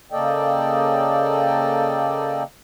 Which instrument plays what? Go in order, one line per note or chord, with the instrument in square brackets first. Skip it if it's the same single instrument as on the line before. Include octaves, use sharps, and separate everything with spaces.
[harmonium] C#3 A#3 A4 D5 D#5 G5